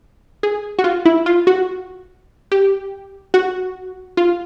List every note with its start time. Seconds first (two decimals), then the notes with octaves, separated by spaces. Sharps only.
0.43 G#4
0.79 F#4
0.84 F4
1.05 E4
1.26 F4
1.47 F#4
2.52 G4
3.34 F#4
4.17 F4